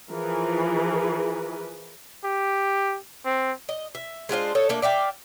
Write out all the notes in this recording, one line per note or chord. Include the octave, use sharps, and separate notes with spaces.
E3 F3 G#4 A#4 B4
G4
C4
D#5
E5
G#3 D4 F4 C5
A4 C#5 D#5
A3 A#3 D4
D5 E5 F5 G5